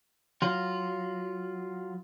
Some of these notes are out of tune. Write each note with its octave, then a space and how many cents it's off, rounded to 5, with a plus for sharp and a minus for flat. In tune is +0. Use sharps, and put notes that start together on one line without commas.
F#3 +0 F4 +0